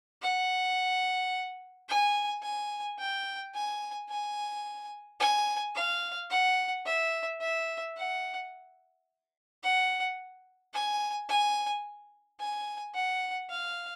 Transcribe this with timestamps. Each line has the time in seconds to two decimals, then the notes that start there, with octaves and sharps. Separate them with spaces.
0.22 F#5
1.89 G#5
2.43 G#5
2.99 G5
3.54 G#5
4.10 G#5
5.20 G#5
5.75 F5
6.31 F#5
6.86 E5
7.41 E5
7.97 F#5
9.63 F#5
10.74 G#5
11.29 G#5
12.40 G#5
12.94 F#5
13.50 F5